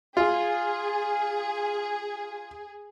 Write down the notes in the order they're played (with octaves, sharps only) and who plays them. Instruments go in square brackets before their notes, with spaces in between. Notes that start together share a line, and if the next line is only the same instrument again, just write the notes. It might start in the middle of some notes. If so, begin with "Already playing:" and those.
[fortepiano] F4 [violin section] G#4